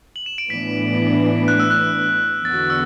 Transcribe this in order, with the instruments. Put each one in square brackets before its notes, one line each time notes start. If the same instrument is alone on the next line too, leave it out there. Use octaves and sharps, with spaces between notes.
[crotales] F#7
E7
D7
[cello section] A2 E3 B3 D4 [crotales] B6
[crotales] F#6
E6
F#6
[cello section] E2 D3 B3 F#4 [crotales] A6
[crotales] E6